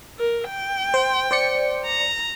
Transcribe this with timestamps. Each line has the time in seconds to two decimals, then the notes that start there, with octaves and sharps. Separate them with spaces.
0.19 A#4
0.49 G5
0.94 C5
1.31 C5 D5 C#7
1.85 A#5